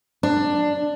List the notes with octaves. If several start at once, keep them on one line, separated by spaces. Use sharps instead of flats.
D4